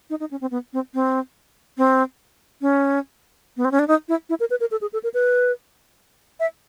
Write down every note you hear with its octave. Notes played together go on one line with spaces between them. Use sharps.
D#4
D#4
C#4
C4
B3
C4
C4
C4
C#4
B3
C4
C#4
D4
D#4
E4
E4
A#4
B4
A#4
A4
G#4
A4
A#4
B4
E5